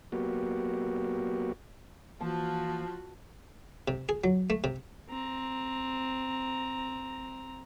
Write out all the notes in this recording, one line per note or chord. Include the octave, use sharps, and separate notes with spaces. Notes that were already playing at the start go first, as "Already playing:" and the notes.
F#3 A#3 B3 F#4 G4
E3 F3 A#3 F4 F#4 A5
C3
G#4
F#3
A3
C3
C4 A#5